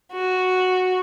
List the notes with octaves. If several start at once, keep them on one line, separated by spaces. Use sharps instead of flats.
F#4